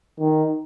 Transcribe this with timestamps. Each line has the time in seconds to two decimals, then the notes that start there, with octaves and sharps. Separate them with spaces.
0.20 D#3